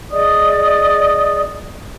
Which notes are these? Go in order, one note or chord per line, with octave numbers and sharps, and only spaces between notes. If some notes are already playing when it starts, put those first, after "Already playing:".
G#4 D5 D#5 D#6